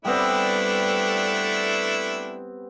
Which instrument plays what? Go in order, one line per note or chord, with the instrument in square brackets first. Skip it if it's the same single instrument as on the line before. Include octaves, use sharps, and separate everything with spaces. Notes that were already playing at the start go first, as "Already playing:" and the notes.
[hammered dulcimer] G3 B3 C4 [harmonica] A3 D4 E4